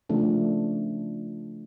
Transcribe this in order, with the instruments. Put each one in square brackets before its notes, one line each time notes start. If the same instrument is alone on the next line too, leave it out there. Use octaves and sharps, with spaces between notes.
[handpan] C#3 F3 A3 D4